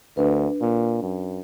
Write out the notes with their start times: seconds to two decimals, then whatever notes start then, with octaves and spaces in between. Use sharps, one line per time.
0.17 D2 D4 B4
0.61 A#2
1.03 F#2